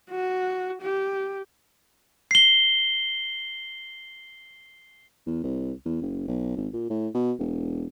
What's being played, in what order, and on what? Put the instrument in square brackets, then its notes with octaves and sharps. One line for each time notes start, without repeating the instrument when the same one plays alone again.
[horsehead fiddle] F#4
G4
[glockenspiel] C7 G7
[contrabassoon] E2
C2
E2
F#1
B1
G#1
A#2
A2
B2
E1